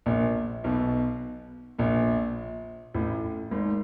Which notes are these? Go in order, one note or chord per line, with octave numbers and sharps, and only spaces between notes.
A#1 A#2
B1 B2
A#1 A#2
A1 A2
G#1 G#2